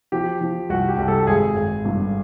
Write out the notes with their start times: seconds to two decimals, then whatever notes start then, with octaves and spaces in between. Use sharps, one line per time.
0.12 F3 G4
0.41 F3
0.69 C2 F#4
0.88 G4
0.98 C2
1.08 A4
1.27 G#1 G#4
1.56 G#1
1.85 G2